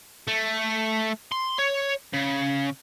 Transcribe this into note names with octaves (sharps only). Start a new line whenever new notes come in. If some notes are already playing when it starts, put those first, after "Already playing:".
A3
C6
C#5
C#3